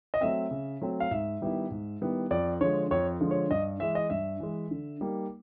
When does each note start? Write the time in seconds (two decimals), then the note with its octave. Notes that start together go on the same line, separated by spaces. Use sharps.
0.14 D#5
0.21 F#3 A3 C4 E5
0.51 C#3
0.82 F#3 A3 C4
1.00 F5
1.11 G#2 E5
1.41 D#3 G3 B3 E4
1.71 G#2
2.01 D#3 G3 B3 E4
2.31 F2 D5
2.61 D3 F3 G#3 C#5
2.91 F2 C#5
3.21 D3 F3 G#3
3.31 C#5
3.51 G2 D#5
3.80 E3 G#3 E5
3.95 D#5
4.10 G2 E5
4.40 E3 G#3
4.71 D3
5.01 G3 A#3 D#4